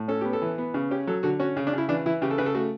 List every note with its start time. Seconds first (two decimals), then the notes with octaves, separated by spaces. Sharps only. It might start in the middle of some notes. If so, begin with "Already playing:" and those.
Already playing: A2
0.08 C#4 A4
0.21 B3 G4
0.33 A4
0.42 E3
0.58 B3
0.74 C#3
0.91 C#4 G4
1.07 F#3 A4
1.23 D3 F#4
1.40 C#4 F#4
1.57 C#3
1.67 D4
1.73 C#3 E4
1.89 E3 D4
2.06 E3 E4
2.22 C#3 G4
2.31 A4
2.38 C#3 B4
2.46 A4
2.55 A3 F#4